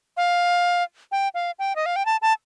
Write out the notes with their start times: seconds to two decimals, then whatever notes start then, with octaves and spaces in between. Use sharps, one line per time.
0.17 F5
1.12 G5
1.34 F5
1.59 G5
1.76 D#5
1.86 F5
1.96 G5
2.06 A5
2.22 A5